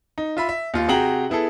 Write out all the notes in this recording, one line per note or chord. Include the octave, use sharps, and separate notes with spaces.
D#4
F4 E5 B5
E5
D#2 F4
C3 F#4 G#4 G5 A#5 F#7
B3 E4 G#4 A4